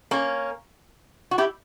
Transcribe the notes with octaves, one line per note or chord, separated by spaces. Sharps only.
A#3 C#4
F#4
E4 G4